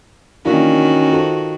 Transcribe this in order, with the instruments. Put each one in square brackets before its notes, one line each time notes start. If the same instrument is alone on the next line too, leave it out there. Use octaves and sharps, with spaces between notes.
[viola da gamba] D#3 F#4 [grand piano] E3 A#3 D4 [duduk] C#4
[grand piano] F4 A4 C5